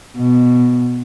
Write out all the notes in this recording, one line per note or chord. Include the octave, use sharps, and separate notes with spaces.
B2